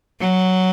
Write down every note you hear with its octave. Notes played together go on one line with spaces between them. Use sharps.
F#3